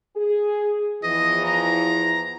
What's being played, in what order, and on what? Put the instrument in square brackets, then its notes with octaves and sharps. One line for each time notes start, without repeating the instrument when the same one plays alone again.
[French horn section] G#4
[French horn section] E2 E3 F3 [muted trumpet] D#5
[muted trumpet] A#5